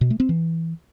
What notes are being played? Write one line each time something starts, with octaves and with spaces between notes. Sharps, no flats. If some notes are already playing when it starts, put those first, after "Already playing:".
B2
A3
C4
E3